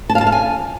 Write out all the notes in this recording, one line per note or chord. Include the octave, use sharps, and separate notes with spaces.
A5
F5
A5
F5
G#5